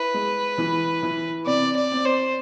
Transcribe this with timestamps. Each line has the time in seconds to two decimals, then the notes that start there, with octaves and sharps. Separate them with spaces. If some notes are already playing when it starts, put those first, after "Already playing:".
Already playing: E4 B4
0.14 G#3
0.58 E3
1.03 E3
1.46 C3 D5
1.76 D5
1.91 C4
2.06 C5